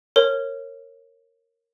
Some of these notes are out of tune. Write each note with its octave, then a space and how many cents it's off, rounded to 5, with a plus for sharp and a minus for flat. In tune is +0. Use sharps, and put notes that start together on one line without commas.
A#4 -10 C#5 -20